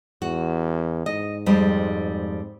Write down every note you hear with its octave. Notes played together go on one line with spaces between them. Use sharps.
E2 F#4
G#2 D#5
F2 G3 G#3